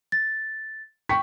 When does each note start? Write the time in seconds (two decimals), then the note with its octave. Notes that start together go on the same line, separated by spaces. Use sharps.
0.12 A6
1.09 G5 C#6 B6